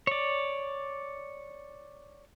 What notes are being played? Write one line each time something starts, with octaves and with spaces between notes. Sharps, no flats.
C#5 D5